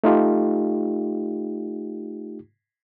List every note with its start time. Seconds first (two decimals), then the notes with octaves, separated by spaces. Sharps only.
0.04 A3 D#4 F4 G4